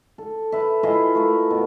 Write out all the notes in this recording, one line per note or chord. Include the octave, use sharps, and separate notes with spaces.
A4
B4 E5
E4 F4 G#4 D#5
A3 A#4
B2